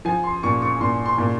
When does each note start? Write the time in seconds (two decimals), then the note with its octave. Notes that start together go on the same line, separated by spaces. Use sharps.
0.05 F3 G#5
0.24 C6
0.43 A#2 C#6
0.62 C#6
0.81 A#2 C6
1.06 C6
1.18 A#2